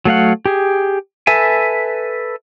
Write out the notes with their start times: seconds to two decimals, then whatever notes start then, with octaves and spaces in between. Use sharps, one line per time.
0.05 F#3 A3 F5 F#5
0.46 G4 G#4
1.27 A4 B4 E5 G#5